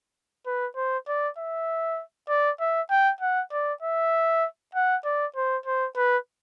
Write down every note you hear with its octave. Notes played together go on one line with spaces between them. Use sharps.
B4
C5
D5
E5
D5
E5
G5
F#5
D5
E5
F#5
D5
C5
C5
B4